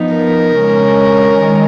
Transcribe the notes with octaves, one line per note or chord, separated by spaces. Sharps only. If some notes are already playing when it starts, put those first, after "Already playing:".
Already playing: F3 B3 D#4
A#4
C#3 G#3 C#4
D#3 G#3